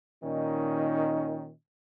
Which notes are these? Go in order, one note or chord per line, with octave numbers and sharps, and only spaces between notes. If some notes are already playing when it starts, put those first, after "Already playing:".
A#2 D#3 C#4 D#4